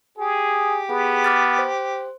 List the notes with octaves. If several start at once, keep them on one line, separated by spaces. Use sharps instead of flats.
G4 G#4
B3 G#4
D6 F6 A6
C5